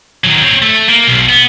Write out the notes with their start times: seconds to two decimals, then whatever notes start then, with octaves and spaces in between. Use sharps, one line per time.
0.24 D#3 F#3
0.41 C4 C#5
0.62 A3
0.89 A#3
1.07 B1
1.29 B3